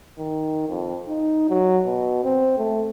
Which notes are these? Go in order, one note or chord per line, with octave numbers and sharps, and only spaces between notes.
D#3
F2
D#4
F#3
B2
C4
A3